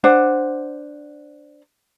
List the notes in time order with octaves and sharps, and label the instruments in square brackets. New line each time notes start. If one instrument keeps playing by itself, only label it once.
[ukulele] D4 C5 F#5